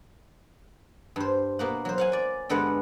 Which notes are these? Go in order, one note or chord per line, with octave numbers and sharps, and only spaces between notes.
G2 C5
B2 A#3 F#5
F#3 C5
F5 F#5 G#5
D5 G#5
G2 D3 G#3 B3 B4 F#5